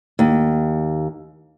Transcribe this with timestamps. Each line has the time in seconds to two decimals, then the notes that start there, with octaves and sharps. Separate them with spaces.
0.19 D#2